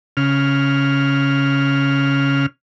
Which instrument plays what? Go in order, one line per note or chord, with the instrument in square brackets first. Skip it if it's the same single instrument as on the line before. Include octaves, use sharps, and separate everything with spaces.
[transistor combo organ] C#3 F6